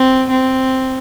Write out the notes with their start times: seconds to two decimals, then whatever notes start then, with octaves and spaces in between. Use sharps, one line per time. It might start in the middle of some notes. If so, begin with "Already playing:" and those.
Already playing: C4
0.30 C4